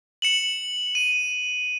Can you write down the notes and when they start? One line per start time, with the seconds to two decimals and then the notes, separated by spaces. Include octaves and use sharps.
0.22 C#7 E7 F#7
0.95 D#7